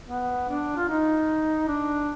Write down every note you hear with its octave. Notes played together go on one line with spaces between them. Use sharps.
B3
D4
F4
D#4
D4